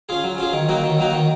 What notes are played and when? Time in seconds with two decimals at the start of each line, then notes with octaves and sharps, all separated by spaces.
0.09 C#4 F4 G#4
0.24 F#3
0.38 C#4 F4 G#4
0.53 D#3
0.68 F#3 A#3 D#4 F#4
0.84 D#3
0.98 F#3 A#3 D#4 F#4
1.13 D#3